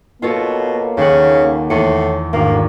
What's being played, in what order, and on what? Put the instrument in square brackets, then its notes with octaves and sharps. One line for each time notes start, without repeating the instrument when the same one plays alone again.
[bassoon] B2 [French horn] A#3 [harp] F4 A4 C#5
[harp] D#2 F#5 [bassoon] C#3
[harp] E2 G#5 C#7 [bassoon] A2
[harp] G#1 [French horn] D2 [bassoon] A#3